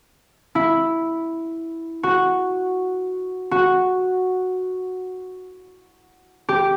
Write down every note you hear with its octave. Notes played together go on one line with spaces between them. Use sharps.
E4
F#4
F#4
G4